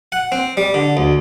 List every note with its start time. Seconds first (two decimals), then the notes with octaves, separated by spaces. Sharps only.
0.12 F#5
0.32 C4
0.57 G3
0.74 D3
0.97 D2